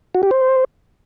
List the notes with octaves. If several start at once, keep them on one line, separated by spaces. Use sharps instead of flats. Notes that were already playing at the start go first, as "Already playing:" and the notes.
F#4
G4
C5